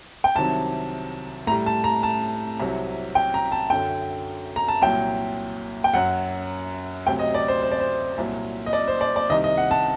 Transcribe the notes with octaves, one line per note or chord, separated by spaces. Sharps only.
G5
C2 C3 D#3 F#3 A5
A2 G3 A#5
A5
A#5
A5
C2 C3 F#3
G5
A#5
A5
F#2 D3 F#3 G5
A#5
A5
C2 A#2 F#3 G5
G5
F#2 F#3 F#5
D2 C3 F#3 G5
D#5
D5
C5
C5
D5
C5
C2 A#2 F#3
D#5
D5
C5
D5
D5
C2 C3 D#3 D#5
D#5
F#5
A5